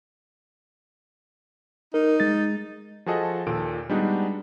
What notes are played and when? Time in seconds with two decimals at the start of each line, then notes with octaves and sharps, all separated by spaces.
1.94 D#4 A#4
2.20 G#3 A6
3.06 F3 F#4 G#4 A4 D#5
3.47 D#2 A#2 A4 D7
3.90 G3 G#3 B3 D4 D#4 F#4